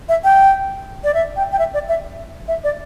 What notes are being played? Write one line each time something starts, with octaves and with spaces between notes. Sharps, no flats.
E5
G5
D5
E5
G5
G5
E5
D5
E5
E5
D5